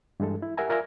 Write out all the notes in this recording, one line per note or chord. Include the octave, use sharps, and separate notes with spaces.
G2 E3 G#3 A4
E4
G4 A#4 E5 F#5 G#5 A#5
F4 A#4 D5 E5 G#5 A#5